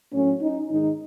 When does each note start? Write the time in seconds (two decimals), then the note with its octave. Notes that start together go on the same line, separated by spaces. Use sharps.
0.12 A2 F#3 A3 C#4
0.41 D#4
0.69 G#2 D#3 G#3 D#4